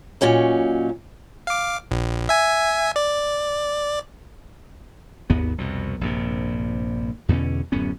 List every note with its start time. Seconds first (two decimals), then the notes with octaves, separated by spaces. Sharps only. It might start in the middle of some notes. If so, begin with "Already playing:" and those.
0.21 A#2 F#3 C#4 D#4
1.47 F5 D6
1.91 A#1
2.29 E5 G#5
2.96 D5
5.30 G#1 D#2 B3
5.58 C2 F2 B2
6.01 A#1 G2 C3
7.29 E2 B2 D3 C#4
7.72 D1 F#2 B3 C#4